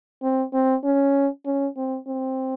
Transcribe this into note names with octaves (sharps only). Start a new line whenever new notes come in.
C4
C4
C#4
C#4
C4
C4